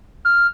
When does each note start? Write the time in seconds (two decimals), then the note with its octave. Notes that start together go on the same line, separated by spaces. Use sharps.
0.25 F6